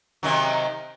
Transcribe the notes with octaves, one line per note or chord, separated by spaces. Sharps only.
C3 D#3 F#3